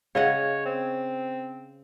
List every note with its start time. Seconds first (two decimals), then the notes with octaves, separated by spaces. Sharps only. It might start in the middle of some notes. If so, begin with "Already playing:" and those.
0.15 C#3 C#5 D#5 F#5
0.66 C4